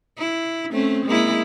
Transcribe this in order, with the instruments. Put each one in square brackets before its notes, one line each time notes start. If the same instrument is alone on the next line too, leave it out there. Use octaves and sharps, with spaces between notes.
[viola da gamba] E4
A3 C4 C#4
G#3 A#3 E4